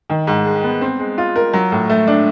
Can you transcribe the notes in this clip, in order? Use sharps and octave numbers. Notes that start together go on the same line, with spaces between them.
D#3
G#2
G#3
B3
C4
G#3
F4
A#4
F#3
A2
A3
D4